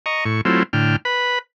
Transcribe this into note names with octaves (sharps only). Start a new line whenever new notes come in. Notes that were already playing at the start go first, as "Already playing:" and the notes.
D#5 A#5 C#6
A2 C#6
F#3 A3 C4 E4 F4
A2 D3 G5 F6
B4 B5